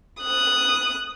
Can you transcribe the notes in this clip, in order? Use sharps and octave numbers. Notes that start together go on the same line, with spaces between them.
D#6 F#6